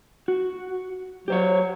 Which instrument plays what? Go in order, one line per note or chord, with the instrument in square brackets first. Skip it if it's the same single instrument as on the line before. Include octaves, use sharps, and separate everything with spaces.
[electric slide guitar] F#4
[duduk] F#3 [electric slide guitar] G4 C5 C#5